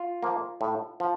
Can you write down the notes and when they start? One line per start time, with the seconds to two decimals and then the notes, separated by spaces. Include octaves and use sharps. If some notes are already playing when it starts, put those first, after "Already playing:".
Already playing: F4
0.23 F3 A#3
0.61 A2
1.00 F3